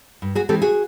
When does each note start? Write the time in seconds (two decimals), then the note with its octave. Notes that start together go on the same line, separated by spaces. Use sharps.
0.22 G2
0.35 F#4 G#4
0.49 E3 G#3 C4 G4 A4
0.62 F#4 G#4